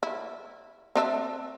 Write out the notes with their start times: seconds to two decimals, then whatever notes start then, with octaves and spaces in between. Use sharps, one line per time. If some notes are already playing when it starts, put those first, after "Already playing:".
0.03 E4
0.95 C4 D4 E5